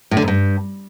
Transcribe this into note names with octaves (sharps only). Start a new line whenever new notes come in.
A2
D3
G#2
G2